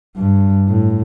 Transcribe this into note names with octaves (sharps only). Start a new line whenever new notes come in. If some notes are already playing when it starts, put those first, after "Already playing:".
G2
A2